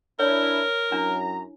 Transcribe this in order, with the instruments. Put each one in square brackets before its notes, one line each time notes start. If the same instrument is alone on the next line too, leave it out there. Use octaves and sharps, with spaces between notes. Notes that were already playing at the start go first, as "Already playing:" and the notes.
[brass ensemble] D4 E4 [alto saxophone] A#4 [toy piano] C#5
[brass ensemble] F#2 A#5 [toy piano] D4 E4